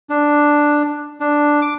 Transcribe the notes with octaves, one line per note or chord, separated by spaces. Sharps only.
D4
D4
D6